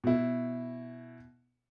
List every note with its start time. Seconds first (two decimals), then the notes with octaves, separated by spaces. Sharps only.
0.04 B2 E4